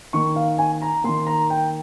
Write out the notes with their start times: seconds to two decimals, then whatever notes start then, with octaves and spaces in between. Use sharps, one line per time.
0.13 D#3 A#3 C#6
0.36 F5
0.58 G#5
0.82 A#5
1.04 D#3 A#3 C6
1.27 A#5
1.50 G5